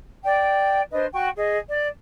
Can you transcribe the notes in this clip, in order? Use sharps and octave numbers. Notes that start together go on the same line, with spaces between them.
D5 G5
D4 B4 C5 D#5
F#4 G5 C#6
G#4 D#5
D5